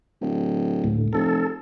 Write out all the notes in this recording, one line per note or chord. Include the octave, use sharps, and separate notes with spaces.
D1
D2 A2
F1 A4